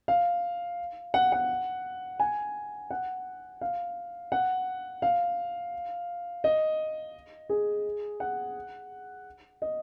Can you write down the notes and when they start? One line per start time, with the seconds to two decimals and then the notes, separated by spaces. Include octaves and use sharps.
0.08 F5
1.14 F#5
1.32 F#5
2.20 G#5
2.91 F#5
3.61 F5
4.32 F#5
5.02 F5
6.44 D#5
7.49 G#4
8.20 F#5
9.62 D#5